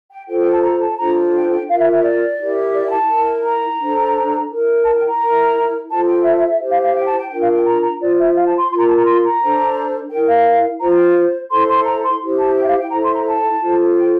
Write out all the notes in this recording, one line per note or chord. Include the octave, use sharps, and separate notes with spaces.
G5
F4 A4 C5 G5
G5
A5
A#5
A5
D4 F4 A4 C5 A#5
G5
G5
F4 A#4 F5
E5
E5
D5
E4 G4 A#4
D5
G5
A5
E4 A#4
A#5
D4 A4 C5
E4 A#4
A5
G5
A#5
E4 A#4
F4 A4 C5 A5
G5
E5
E5
E5
E4 G4 C5
F5
F5
G5
A5
G5
D4 F4 A#4 G5
F5
G5
A#5
A#5
F4 C5 D5
E5
F5
A5
C6
F4 C6
A#4 A#5
A5
A#5
C6
A#5
D4 A4 C5
E4 A#4 G5
F5
F4 C5 A#5
G5
E4 A4 C5 C6
C6
A#5
C6
E4 G4 C5
A5
G5
E5
F5
G5
E4 A4 C5 A#5
C6
A#5
A5
F4 A4 C5
G5